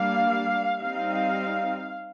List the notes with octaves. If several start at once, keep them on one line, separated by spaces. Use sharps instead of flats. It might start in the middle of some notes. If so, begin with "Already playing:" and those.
Already playing: G3 A#3 D4 F5
G3 C4 D#4 F5